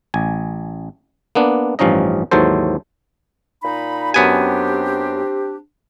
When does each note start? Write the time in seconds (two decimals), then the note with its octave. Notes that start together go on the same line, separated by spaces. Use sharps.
0.14 A1 G#5
1.35 A#3 B3 D4
1.79 A1 G2 F3 C#4 D#4 D#5
2.31 D#2 G#2 E3 F#3 A4 C5
3.63 A#2 D#4 B5
4.14 F#2 B3 C4 D4 G4 G#5